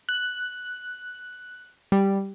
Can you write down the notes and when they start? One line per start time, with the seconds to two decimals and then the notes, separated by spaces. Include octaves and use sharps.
0.09 F#6
1.92 G3